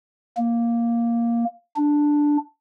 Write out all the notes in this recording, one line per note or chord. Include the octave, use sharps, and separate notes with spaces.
A#3
D4